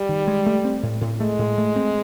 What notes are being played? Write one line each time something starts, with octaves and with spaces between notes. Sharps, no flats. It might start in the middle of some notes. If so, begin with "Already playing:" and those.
Already playing: G3
D#3
G#3
A3
C4
A2
A2
G#3 A3
A2
A3
C4